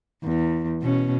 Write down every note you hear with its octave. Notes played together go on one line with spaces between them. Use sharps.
E2
B2 C#4